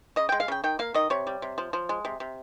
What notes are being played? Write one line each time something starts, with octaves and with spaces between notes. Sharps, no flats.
C#3 D#5
G5
G#3
F5
C#3 G5
D#3 G5
A#3 F5
D#3 D#5
C3 C#5
G3
C3
F3
F3
G#3
C3
C3